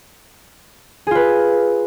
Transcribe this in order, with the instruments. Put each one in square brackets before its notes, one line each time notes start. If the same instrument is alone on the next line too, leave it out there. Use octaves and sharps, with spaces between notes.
[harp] G#4
F4
B4